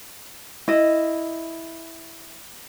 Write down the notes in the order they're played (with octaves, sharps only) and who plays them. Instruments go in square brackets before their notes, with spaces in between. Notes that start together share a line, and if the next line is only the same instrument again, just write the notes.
[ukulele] E4 D#5